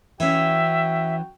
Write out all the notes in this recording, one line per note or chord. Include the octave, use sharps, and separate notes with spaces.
E3 C#4 F#4 E5 G5